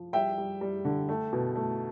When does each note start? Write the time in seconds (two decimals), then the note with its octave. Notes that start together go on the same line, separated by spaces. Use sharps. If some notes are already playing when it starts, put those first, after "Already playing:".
Already playing: F3
0.13 G3 E5 G5
0.38 G3
0.61 G3
0.85 D3
1.09 A3
1.33 B2
1.56 A3